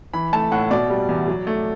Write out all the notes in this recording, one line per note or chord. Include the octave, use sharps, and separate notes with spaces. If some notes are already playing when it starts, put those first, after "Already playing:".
E3 B5
A3 A5
A2 F#5
B2 D5
G3
E2
F#3
A3